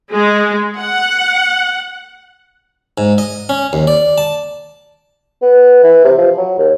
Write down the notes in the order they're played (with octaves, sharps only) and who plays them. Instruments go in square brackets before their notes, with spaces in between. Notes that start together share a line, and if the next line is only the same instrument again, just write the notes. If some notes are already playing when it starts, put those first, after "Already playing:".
[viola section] G#3
F#5
[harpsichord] G#2
D#5
C#4
D#2
D5
A5
[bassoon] B3
E3
C3
F3
F#3
D#2